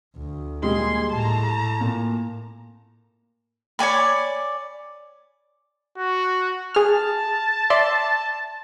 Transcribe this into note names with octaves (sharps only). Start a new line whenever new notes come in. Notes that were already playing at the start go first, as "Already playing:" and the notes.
D2
A#2 G3 G#3 G#4 C6
A2 A5 A#5
A#2
C#5 D5 G#5 B5
F#4
G#4 A5 F6
D5 E5 C6